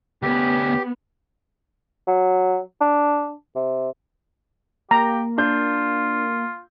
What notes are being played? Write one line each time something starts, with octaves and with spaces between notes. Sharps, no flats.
D2 B3 C#4 G4
F#3
D4
C3
A#3 G4 A#5
D4 F4 G6